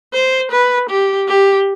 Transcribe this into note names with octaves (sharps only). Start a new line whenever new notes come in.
C5
B4
G4
G4